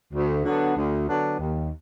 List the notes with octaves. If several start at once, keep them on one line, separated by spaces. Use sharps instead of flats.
D2
D3 F#3 B3 D4
D2
D3 F#3 B3 D4
D#2